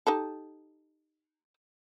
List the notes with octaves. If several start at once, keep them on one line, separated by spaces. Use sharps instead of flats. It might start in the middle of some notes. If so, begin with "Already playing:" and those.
D#4 G4 A4